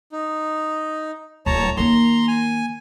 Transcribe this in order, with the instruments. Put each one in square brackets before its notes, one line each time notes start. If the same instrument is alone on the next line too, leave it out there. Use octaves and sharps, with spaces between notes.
[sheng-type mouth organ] D#4
[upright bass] D1 [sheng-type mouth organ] C#5 A5 A#5
[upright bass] D#3 A#3 [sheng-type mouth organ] A#5 C6
[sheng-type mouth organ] G#5